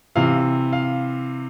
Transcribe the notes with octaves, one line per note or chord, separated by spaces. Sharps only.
C3 E3 F5
F5